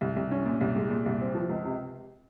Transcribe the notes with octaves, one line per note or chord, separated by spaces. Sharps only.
C2
C2
C#4
A#2
C2
G#3
A#2
C2
C4
F3
C#2
C3